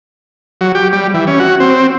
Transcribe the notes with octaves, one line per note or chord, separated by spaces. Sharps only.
F#3
G4
G3
E3
C#4
F#4
C4